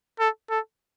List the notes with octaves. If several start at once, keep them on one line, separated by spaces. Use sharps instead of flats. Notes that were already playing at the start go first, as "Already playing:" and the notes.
A4
A4